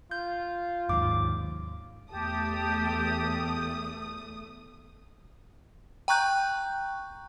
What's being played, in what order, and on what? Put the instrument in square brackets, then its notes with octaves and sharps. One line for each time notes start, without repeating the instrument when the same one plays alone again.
[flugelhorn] F4 [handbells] G6
[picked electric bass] D#2 G#2 [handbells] D6
[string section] E2 A3 D#6 [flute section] G4 A5
[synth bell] G5 A#5 C#6 F#6 G6